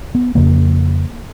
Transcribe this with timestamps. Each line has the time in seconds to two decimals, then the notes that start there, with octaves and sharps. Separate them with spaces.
0.15 B3
0.35 F2 C#3 A#3